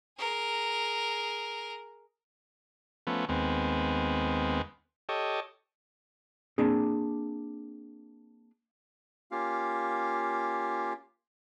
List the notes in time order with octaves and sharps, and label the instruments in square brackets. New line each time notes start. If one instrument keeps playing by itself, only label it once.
[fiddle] G#4 A#4
[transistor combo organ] F3 A3 B3 C#4
D#2 G#3 B3 C4
G4 A4 C#5 D#5
[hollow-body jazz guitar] A#3 C4 D4 G#4
[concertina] A#3 C#4 F4 G4 F5